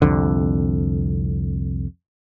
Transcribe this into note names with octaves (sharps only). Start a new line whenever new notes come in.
C2 F2 D3